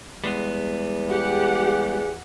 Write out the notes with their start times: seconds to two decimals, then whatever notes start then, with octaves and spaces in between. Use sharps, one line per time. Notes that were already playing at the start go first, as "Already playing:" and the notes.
0.24 E2 G3 G#3 B3
1.10 G4 G#4 F#5